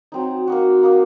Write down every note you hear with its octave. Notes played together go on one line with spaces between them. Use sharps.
F#3 C4 D#4
A#3 D#4 F#4
A#3 D#4 F#4